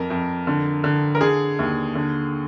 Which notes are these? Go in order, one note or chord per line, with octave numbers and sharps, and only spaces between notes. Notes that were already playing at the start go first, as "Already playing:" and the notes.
Already playing: F2 A#4
F2
D3
D3
A#4
D3 G#4
D#2
D3